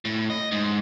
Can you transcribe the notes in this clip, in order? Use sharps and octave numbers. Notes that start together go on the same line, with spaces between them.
A2
D#5
G#2